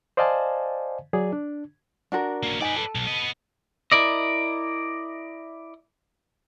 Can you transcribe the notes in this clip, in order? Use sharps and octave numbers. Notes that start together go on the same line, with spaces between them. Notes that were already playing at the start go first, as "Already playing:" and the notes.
C5 D5 D#5 F5 G#5 A5
F#3 G#4 D5
D4
D4 F#4 A#4
A#3 C#4
D#4 B4 D5 G#5
A4
B1
B3 D#5
E4 A#4 D5 D#5